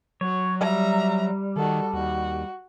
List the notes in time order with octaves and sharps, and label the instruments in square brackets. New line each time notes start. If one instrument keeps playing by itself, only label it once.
[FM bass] F#3 [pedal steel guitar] C#5
[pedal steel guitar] G3 [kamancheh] E5 A#5
[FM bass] D#3 [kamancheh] F#4 A4
[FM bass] D#2 [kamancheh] F#4